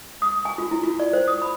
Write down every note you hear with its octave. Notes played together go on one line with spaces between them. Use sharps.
D#6
G#5
F4
E4
F4
D5
C5
D#6
B5